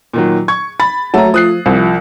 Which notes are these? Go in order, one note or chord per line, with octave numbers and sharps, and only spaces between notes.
A#2 D#3 F#3
C#6 G#6
B5 A6
F#3 A3 A5 A#5
F3 D#6 F#6 C7
C2 F3